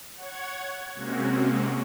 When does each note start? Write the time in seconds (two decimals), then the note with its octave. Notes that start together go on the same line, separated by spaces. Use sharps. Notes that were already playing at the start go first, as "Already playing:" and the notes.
0.15 C#5 F#5 G#6
0.95 C3 G#3 A#3 C4 C#4 F#4